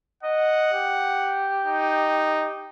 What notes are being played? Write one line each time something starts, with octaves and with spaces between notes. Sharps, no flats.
D#5 F#5
G4
D#4